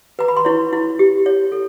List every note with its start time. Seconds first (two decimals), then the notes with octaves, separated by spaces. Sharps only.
0.19 B4 A#5
0.28 B5
0.37 C6
0.45 E4 C#5 C#6
0.73 E4
0.99 G4
1.26 C#5
1.52 A4